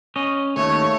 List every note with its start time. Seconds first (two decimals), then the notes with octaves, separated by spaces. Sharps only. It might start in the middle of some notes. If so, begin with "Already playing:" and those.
0.16 C#4 D#5
0.57 D#2 A3 C#5